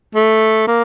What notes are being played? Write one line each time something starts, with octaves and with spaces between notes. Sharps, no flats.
A3
A#3